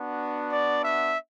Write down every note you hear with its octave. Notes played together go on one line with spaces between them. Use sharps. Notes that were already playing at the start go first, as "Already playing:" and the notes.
Already playing: B3 D4 F#4
D5
E5